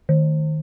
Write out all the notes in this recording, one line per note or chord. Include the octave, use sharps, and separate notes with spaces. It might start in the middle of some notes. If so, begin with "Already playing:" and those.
D#3